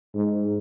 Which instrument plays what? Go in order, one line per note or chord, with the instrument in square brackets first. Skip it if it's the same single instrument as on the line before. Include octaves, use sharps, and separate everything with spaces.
[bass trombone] G#2